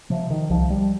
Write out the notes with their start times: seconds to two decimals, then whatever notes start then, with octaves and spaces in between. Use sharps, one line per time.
0.10 C3 F3
0.30 D#3
0.50 C2 F3
0.70 G3